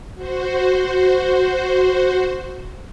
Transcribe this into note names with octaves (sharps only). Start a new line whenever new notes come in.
F#4 C5